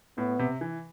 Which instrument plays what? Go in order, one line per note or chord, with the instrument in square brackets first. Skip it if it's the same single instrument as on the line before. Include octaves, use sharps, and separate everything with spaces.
[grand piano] A2 [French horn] B3
[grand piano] C3
E3